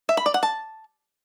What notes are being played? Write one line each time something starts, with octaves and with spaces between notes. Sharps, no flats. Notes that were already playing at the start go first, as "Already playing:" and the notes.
E5
B5
D5
F#5
A5